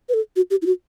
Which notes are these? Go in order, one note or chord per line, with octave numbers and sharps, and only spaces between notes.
B4
A4
F#4
G4
E4
F#4